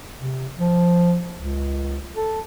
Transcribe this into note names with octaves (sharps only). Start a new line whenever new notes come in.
C3
F3
C#2
A4